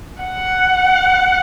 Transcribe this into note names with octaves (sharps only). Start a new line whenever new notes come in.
F#5